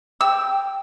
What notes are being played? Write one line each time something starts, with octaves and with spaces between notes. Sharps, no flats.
G5 E6